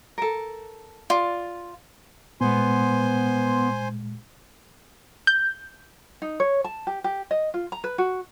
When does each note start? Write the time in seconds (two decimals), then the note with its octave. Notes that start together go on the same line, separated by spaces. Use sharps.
0.18 A4 A#4
1.10 F4 D5
2.41 A#2 G#3 B3 C5 G#5 C6
5.27 G6
6.22 D#4
6.40 C#5
6.64 A5
6.87 G4
7.04 G4
7.31 D#5
7.54 F4
7.72 A#5
7.84 B4
7.98 F#4